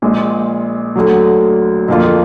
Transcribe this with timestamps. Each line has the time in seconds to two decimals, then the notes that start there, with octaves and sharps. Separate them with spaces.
0.02 A#1 A#2 G#3
0.96 D2 D3 F#3
1.88 F2 D3 F3 A#3 F4